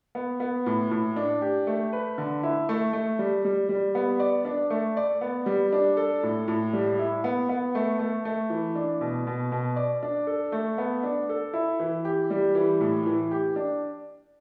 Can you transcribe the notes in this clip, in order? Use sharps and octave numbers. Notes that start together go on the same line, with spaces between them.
B3
B3
A2
A2
D4
G4
A3
B4
D3
E4
A3
A3
G3
G3
G3
B3
D5
D4
A3
D5
B3
G3
D4
A4
A2
A2
G3
E4
B3
B3
A3
A3
A3
E3
D4
B2
B2
B2
D5
D4
A4
A3
B3
D4
A4
E4
E3
G4
G3
E3
A2
E3
G4
D4